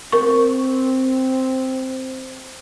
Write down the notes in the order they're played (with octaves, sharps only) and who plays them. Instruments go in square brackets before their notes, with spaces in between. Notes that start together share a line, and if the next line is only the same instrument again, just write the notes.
[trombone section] C4 [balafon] A#4 C#6